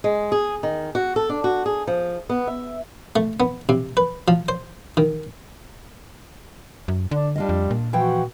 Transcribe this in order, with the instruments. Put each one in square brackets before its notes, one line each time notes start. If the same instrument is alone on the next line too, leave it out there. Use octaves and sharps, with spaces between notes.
[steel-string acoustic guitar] G#3
G#4
D#3
F#4
A4
D4
F#4
G#4
F3
B3
E5
[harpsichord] A3
B3
C3
B4
F3
C5
D#3
[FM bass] F#2
[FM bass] D3 [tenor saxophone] D4
[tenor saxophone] G3 [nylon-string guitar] D4 F4 D#5
[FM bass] F2
A#2
[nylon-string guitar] E3 F3 G5 [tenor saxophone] F#4